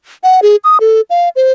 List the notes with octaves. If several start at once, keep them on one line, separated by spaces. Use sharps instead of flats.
F#5
G#4
D#6
A4
F5
C5